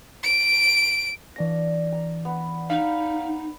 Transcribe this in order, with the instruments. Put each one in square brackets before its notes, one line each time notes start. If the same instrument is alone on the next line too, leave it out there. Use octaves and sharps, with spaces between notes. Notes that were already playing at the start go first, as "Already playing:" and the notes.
[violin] D7
[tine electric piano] E3 A#6 [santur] D4 F5
[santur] A#5
B3
[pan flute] D#4 [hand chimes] F5